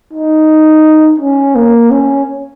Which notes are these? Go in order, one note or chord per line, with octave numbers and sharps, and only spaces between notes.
D#4
C#4
A#3
C#4